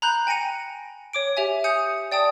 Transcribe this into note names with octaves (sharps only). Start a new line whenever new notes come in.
A#5 B5 F#6 G6
G5 G#5 A#6 C#7 D#7
C#5 D6 D7
G4 E5 G#5
G#5 D#6 G6 C#7
D5 G5 A5 D#6